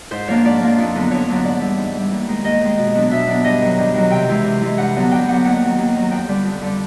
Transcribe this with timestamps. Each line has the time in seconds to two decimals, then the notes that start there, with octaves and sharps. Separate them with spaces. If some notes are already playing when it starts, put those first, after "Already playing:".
0.11 G#2 C5
0.28 F3 A#3 D4 C#5
0.45 G#2 D5
0.62 F3 A#3 D4
0.78 F2
0.95 D3 F#3 B3 D4
1.11 F2 C#5
1.28 D3 F#3 B3 D4
1.44 G#2 D5
1.61 E3 G3
1.78 G#2
1.95 E3 G3
2.11 D#2
2.28 D#3 G#3
2.44 D#2 D#5
2.61 D#3 G#3
2.78 B2
2.94 F#3 B3 D4
3.11 B2 E5
3.27 F#3 B3 D4
3.44 G2 D#5
3.61 D#3 F#3
3.79 G2
3.94 D#3 F#3
4.10 C3 G5
4.28 E3 G#3
4.44 C3
4.61 E3 G#3
4.77 G2 F#5
4.95 D3 F#3 B3
5.11 G2 G5
5.28 D3 F#3 B3 F#5
5.44 D#2 F#5
5.61 D#3 F#3
5.79 D#2
5.94 D#3 F#3
6.11 F2 G5
6.28 D3 G3
6.45 F2
6.61 D3 G3